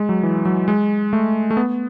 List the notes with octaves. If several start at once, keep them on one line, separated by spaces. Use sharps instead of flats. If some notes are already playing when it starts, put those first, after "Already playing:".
Already playing: G#3
F#3
E3
F#3
G#3
A3
A3
B3